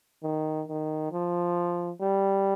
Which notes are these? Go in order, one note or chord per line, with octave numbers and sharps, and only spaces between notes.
D#3
D#3
F3
G3